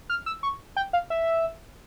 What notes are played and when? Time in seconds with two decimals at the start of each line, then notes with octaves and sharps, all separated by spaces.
0.10 F6
0.26 E6
0.43 C#6
0.77 G5
0.93 F5
1.10 E5